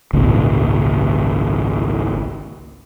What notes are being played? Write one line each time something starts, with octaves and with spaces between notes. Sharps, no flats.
G#1 C#2 A#2